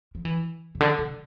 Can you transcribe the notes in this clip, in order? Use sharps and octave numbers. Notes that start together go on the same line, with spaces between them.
F3
E3
C3
D3
C3